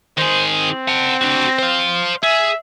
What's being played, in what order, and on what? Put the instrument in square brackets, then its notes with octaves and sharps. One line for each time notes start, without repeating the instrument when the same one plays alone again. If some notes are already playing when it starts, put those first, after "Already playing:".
[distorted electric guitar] D#3 G#4 [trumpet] C5
[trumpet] C4
[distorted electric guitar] F#5 A5
D4 F#4
C5 F5
[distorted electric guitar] G#4 [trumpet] E5